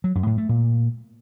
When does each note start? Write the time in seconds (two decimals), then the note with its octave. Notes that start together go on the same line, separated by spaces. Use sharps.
0.04 F#3
0.15 F#2
0.27 A2
0.38 A3
0.49 A#2